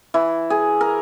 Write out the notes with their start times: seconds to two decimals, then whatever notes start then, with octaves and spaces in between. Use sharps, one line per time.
0.14 E3
0.50 G#4
0.81 A#4